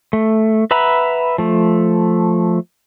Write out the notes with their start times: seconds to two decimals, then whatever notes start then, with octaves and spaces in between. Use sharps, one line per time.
0.13 A3
0.71 B4 E5 F#5 A#5 B5
1.38 F3 A3